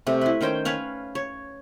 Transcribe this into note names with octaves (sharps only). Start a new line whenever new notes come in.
C3 A3
E4 B4
D#3 C#4 C5 G5
C#4 B4 C#5 F5
C#5